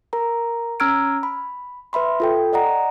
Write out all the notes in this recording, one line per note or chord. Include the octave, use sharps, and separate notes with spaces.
A#4 A#5
C#4 A#5 E6 F6 G#6 D7
B5
B4 E5 B5 C6
F4 A4 G5
D5 D#5 F#5 A#5